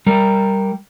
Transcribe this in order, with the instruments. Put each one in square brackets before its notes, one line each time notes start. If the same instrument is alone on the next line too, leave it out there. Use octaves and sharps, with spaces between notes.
[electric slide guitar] G3 A#4